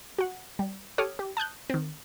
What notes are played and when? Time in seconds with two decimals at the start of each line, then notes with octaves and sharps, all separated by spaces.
0.18 F#4 F#5
0.59 G3
0.98 G4 A4 C#5 D6 D#6 F6
1.19 G4
1.37 A5 D#6 F#6 G6
1.70 D#3 C4